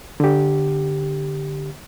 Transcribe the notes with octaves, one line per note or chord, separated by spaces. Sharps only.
D3 G4